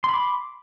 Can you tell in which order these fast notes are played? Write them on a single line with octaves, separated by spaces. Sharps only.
C6 B5 D6